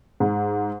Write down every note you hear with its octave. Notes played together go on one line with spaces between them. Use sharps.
G#2